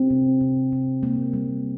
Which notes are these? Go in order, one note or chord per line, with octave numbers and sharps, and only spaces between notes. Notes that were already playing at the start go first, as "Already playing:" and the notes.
Already playing: C4
C3
C3
C3
A#3
G3